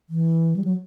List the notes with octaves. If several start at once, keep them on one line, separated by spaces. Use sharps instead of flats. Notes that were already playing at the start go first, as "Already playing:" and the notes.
E3
G3
F#3